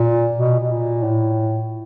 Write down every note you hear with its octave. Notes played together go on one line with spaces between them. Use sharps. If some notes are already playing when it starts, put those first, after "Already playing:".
Already playing: A#2
B2
B2
A#2
A2